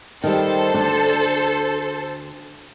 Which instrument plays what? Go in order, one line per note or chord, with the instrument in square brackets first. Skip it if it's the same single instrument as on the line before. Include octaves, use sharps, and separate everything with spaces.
[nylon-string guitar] D#3 G3 [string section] A4 C5
[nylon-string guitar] D2 D4